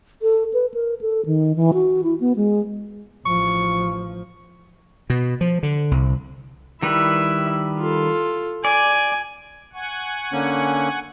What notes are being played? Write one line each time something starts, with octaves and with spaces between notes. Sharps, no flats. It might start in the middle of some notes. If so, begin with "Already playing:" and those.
A4
B4
A#4
A4
D#3
E3
F#4
E4
B3
G#3
A1 F3 C#6
B2
F3
D3
C2
D#3 G3 E4 B4 E5
F4 A4
D5 G#5
F#5 G#5 C#6
D3 A#3 C#4